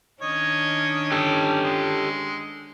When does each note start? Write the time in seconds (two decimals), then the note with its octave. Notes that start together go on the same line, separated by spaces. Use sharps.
0.22 D#3 C#4 D4 C#5 D#5
1.12 G4 A4
1.63 G#3